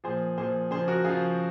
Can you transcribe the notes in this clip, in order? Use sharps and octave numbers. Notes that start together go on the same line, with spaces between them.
A#2 F3 G#4 C5
A#2 F3 G#4 C5
C#3 F3 G#4 C5
F#4 A#4
C#3 F3 F4 G#4